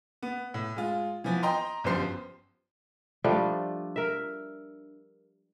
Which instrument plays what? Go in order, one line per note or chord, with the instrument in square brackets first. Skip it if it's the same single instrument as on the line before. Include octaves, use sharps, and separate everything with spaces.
[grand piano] B3
A2
G#3 F4
E3 F3 B3
D#5 G5 A#5 C6
G1 F#2 F3 G4 C5 C7
[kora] F3 G3 A3 D4
A#4 E5